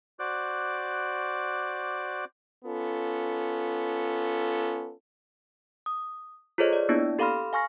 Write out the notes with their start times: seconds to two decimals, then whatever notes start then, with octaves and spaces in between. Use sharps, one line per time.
0.19 F#4 C5 D5 D6 F#6
2.65 B3 C#4 F4 A4
5.86 D#6
6.58 F4 G#4 A4 C5 C#5 D#5
6.73 D5
6.89 A#3 B3 D4 E4 D5
7.19 G4 A4 F5 B5 C6 F6
7.53 F5 G#5 C#6 F6 A#6